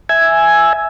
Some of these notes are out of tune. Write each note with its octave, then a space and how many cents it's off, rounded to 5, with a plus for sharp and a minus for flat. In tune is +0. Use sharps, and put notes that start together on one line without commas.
E5 +0 G#5 +5